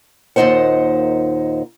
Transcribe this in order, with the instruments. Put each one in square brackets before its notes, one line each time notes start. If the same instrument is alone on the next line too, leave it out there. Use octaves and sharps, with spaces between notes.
[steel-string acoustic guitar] D#2 A#2 F#3 D#4 C5 F#5